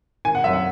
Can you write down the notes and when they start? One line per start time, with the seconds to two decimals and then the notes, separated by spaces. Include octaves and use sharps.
0.25 D#3 G#5
0.35 F#5
0.44 F#2 E5
0.53 F#5